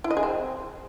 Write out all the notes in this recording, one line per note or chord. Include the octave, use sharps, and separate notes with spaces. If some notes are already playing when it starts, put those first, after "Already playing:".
E4
D#5
G#4
C4